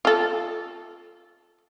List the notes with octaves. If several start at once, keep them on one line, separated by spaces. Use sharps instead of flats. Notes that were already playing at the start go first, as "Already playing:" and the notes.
F4 A4